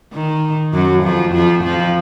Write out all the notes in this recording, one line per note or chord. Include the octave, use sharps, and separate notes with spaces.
D#3
F#2 F#3
F2 F3
F2 F3
F2 F3